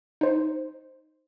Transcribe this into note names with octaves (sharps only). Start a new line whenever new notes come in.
D#4 C5